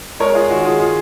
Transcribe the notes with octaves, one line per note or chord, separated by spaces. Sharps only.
G#3 A#4 C#5
G#3 F4 G#4
D#3 F#4
D#3 F4 G#4
D#3 F4 G#4